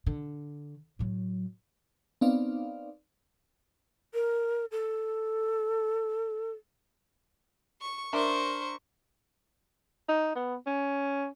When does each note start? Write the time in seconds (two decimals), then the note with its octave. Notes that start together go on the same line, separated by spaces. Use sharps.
0.06 D3
0.99 A2 F#3
2.21 B3 C4 D#4 D5 F5
4.14 A#4
4.72 A4
7.82 C#6
8.13 D4 A#4 C5 E5 C#6
10.09 D#4
10.35 B3
10.67 C#4